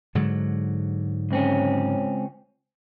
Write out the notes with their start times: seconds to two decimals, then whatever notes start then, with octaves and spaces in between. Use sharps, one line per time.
0.15 G#2 D3 F#3
1.31 C#2 C4 C#4